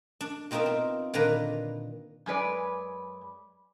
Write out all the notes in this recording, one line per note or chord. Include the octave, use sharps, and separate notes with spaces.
D4
B2 C4 D#4 F4 A#4 E5
C4
A#2 D3 D#3 D4 B4 A#5
F#2 G#3 B4 D5